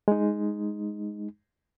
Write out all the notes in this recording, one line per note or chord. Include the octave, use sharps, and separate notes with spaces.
G#3 D#4